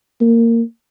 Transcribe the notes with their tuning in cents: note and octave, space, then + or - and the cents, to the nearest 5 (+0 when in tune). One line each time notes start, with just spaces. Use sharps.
A#3 -15